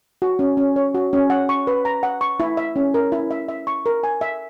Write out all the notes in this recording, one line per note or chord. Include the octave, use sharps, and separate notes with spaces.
F#4
C#4
C#4
C#5
F#4
C#4
F#5
C#6
B4
A#5
F#5
C#6
E4
E5
C#4
A#4
E4
E5
E5
C#6
A#4
G#5
E5